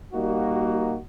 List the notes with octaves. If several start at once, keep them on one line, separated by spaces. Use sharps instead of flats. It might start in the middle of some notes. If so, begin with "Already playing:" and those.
A#2 G3 A#3 D#4 F#4